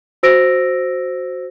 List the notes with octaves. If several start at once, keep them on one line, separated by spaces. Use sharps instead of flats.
F#4 C5 E6 A#6 D7